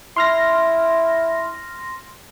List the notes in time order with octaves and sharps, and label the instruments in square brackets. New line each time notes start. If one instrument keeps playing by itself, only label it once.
[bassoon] E4 [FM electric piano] C6 F6 A#6